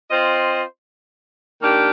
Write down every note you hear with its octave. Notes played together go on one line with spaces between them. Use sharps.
C4 F4 C5 D#5
D#3 A#3 D4 G4